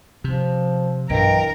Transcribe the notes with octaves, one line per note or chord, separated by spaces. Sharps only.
C3 F3
B1 G2 E3 A#4 D#5 G5